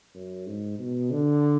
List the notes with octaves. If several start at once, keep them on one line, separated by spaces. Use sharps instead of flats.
F#2
G#2
B2
D3